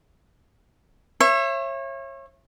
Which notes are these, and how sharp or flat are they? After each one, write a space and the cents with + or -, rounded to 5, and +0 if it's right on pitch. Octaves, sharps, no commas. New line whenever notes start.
C#5 -30 E5 +30